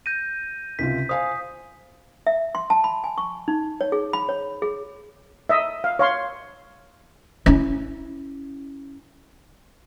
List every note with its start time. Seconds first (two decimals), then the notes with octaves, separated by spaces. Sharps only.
0.06 G6 A#6 D#7
0.79 C#2 C3 F4 B6
1.09 C5 F5 G#5 D#6
2.27 E5
2.55 C6
2.70 A5
2.84 B5
3.04 G#5
3.18 C#6
3.48 D#4
3.81 C#5
3.92 G#4
4.13 B5
4.29 C#5
4.62 G#4
5.49 D#5 E5
5.84 F5
5.99 C#5 F5 C6
7.46 C#4 E4